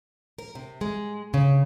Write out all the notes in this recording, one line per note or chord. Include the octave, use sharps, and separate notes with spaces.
A#4
C3
G#3
C#3